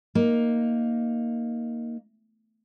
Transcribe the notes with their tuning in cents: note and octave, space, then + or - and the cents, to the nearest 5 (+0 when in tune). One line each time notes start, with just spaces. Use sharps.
A#3 +0 D#4 +0